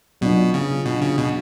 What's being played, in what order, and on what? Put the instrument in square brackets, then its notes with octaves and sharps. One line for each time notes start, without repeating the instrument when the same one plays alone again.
[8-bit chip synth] B2 [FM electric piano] F#3 B3 D4 F4
[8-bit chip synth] C#3
B2
C#3
B2